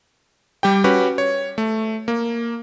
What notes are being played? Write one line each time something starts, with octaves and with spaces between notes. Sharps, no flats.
G3 G4 G5
C#4 F#4 G4 B4
C#5
A3
A#3